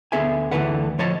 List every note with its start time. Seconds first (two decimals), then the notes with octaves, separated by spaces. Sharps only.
0.12 D2 D3 B3 G#4 E5 G#5
0.51 D2 B2 D3 E3 B4 F#5
0.99 F3 C#5 D#5 A5